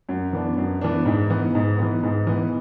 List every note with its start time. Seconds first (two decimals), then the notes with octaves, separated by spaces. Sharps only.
0.09 F#2
0.33 E3 B3 D4
0.58 F#2
0.81 E3 B3 D4
1.06 G#2
1.30 E3 B3
1.55 G#2
1.78 E3 B3
2.03 G#2
2.27 E3 B3